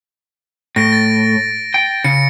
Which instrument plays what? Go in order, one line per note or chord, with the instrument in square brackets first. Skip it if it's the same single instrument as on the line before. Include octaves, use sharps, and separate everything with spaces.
[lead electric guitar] A2 [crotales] A#6 D7
[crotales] A6
[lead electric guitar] G5
[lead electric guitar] C#3 [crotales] C#7